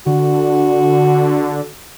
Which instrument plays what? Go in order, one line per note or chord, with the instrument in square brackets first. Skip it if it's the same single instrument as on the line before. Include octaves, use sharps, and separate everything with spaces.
[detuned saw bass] D3 [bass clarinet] F#4